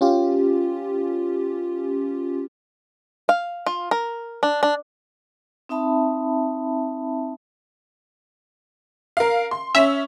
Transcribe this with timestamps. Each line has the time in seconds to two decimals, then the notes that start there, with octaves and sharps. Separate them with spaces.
0.01 C#4 F4 G4
3.29 F5
3.66 F4
3.91 A#4
4.43 D4
4.63 D4
5.69 C4 D#4 E5 A5 B5
9.17 A#4 F5
9.51 C6
9.75 C#4 E5